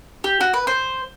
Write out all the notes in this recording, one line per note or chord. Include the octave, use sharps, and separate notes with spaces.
G4
F#4
B4
C5